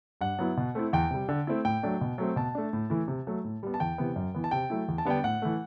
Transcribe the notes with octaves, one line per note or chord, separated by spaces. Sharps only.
G2 F#5
F#3 B3 E4
B2
A3 C4 E4
E2 G5
C3 G3
D3
A3 C4 E4
A2 G5
F#3 A3 D4
B2
F#3 A3 C4
B2 A5
A3 D4
A2
E3 A3 E4
C3
F#3 A3
A2
G3 B3
A5
E2 G5
C3 E3 B3
F#2
E3 B3
A5
C3 G5
F#3 A3 E4
E2
A5
D3 G3 B3 D4 G5
A2 F#5
E3 A3